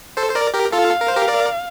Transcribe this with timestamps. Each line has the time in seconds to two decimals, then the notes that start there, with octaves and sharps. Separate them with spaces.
0.17 A4 C5
0.30 C5
0.35 A#4 D5
0.54 G4 A#4
0.72 F4 A4 F5
1.01 A#4
1.08 C5
1.16 G4 A#4
1.28 A#4 D5